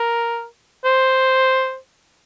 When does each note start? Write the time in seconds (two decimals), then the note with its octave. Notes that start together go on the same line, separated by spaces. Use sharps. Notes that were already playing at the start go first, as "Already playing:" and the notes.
Already playing: A#4
0.85 C5